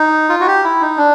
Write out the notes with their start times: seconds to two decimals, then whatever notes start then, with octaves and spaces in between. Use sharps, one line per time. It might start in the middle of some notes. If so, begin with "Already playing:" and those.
Already playing: D#4
0.29 F4
0.40 F#4
0.47 G4
0.64 E4
0.81 D#4
0.97 D4